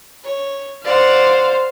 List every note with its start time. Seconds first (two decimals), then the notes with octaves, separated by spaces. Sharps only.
0.24 C#5
0.84 C5 D5 F5 F#5